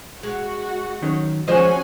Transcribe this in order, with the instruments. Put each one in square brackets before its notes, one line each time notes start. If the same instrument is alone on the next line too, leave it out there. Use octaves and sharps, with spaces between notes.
[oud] G#3 [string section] F#4
[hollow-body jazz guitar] D#3 F#3 C#4
[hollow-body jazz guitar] F3 [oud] G#3 C5 D#5 [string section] C#4 F#4 G#5